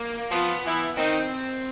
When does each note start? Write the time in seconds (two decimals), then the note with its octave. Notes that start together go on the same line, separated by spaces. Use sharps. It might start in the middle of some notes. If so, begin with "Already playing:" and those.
Already playing: A#3
0.31 F3 B3 F4
0.65 E3 E4
0.97 D#3 C4 D#4